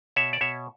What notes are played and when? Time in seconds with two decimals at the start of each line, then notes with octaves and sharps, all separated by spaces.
0.16 B2 C#5 E5
0.33 D5
0.41 B2 C#5 E5